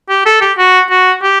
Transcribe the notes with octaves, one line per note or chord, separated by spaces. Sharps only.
G4
A4
G4
F#4
F#4
G4